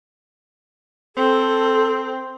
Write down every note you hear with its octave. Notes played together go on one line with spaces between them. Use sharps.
C4 A4